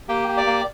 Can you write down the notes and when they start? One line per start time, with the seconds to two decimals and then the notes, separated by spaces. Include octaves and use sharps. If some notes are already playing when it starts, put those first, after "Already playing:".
0.09 A#3 G4 G5
0.28 G4
0.37 D5 D6
0.47 A#3